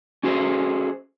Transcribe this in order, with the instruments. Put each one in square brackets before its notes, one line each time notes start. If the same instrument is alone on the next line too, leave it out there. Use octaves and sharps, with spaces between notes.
[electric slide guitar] C#4 F#4 G#4 A4 C5